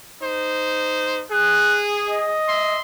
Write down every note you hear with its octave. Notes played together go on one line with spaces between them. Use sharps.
D#4 C5
G#4 F#6
D#5
E5 C6